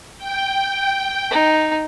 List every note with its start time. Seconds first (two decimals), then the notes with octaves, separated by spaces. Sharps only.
0.18 G5
1.31 D#4